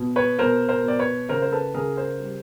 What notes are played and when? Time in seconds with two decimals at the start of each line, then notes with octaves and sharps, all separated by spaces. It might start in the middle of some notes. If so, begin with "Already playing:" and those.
Already playing: B2
0.16 B4 C#5
0.39 B2 A#4 C5
0.69 A#4 C5
0.83 B2 D5
0.99 B4 C#5
1.29 C#3 A#4 C5
1.42 C5
1.52 A4 B4
1.74 C#3 G#4 A#4
1.97 A#4 C5
2.19 G3